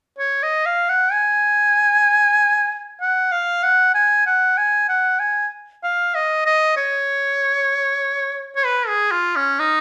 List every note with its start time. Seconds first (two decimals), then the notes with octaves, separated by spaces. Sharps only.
0.19 C#5
0.43 D#5
0.66 F5
0.89 F#5
1.12 G#5
3.01 F#5
3.32 F5
3.63 F#5
3.94 G#5
4.27 F#5
4.58 G#5
4.89 F#5
5.19 G#5
5.83 F5
6.15 D#5
6.46 D#5
6.77 C#5
8.56 C#5
8.65 B4
8.88 G#4
9.11 F4
9.36 C#4
9.59 D#4